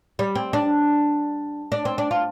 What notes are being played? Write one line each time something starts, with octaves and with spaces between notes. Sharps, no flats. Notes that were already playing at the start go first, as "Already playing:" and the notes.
G3
C4
D4
D4
C4
D4
F4